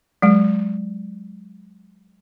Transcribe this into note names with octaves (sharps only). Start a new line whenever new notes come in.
F#3 G#3